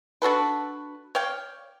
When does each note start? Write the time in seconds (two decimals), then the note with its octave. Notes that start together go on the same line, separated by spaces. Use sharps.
0.22 D4 F#4 A4 B4
1.15 C#5 D5 F5 G5